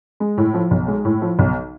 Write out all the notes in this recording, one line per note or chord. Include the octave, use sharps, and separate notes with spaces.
G#3
A2
F3
B1
G#3
A2
F3
B1